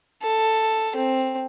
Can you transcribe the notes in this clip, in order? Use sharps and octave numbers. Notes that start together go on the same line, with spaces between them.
A4
C4